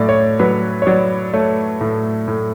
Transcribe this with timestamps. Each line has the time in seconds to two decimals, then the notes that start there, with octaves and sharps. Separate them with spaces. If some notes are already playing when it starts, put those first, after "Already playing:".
Already playing: A2 F#3 D5
0.09 C#5
0.39 F#3 B4
0.82 C#5
0.87 F#3 D5
1.33 A3 C#5
1.81 A2
2.28 A2